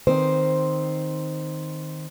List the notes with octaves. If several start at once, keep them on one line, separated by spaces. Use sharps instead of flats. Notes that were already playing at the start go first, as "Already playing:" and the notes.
D#3 C4 C5